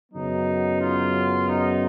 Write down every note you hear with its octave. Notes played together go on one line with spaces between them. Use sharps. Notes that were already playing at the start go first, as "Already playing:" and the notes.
F#2 C#3 F#3 B3 D#4
F4
D#4